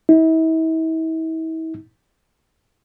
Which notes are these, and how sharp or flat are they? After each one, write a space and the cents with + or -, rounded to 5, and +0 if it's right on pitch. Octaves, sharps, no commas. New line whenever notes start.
E4 -40